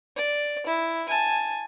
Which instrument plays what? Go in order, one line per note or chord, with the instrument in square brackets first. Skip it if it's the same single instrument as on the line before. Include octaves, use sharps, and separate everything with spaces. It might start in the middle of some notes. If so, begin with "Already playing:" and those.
[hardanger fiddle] D5
E4
G#5 A5